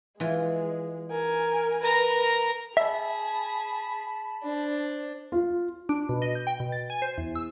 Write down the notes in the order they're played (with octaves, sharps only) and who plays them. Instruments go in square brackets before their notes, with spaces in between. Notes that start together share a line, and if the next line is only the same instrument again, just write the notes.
[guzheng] E3 F4 [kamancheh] G#3
[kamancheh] A#4 G#5
[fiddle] A#4 A#5 [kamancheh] B4
[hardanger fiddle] G#4 [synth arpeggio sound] E5 [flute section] A5 B5
[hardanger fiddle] D4 C5
[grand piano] F4
[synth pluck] D4
B2
D#5
G6
G5
B2
A6
G#5
C5
E2
E6